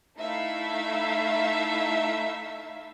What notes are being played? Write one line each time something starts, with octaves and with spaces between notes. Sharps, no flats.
A3 D#4 E4 E5 F5